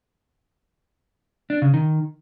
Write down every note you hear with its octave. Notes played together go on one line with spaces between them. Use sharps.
D4
C#3
D#3